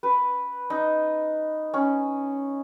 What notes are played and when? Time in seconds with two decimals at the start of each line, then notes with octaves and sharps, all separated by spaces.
0.03 B4
0.70 D#4
1.74 C#4